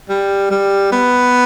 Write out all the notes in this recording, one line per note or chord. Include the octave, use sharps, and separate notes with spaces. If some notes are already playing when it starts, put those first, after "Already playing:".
G3
G3
B3